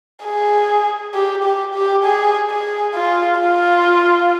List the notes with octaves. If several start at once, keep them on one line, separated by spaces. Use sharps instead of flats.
G#4
G4
G4
G4
G#4
G#4
F4
F4